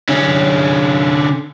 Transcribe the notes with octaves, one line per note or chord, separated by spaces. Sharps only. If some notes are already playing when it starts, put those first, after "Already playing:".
D3 C#4